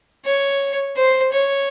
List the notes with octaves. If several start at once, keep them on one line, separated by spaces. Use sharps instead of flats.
C#5
C5
C#5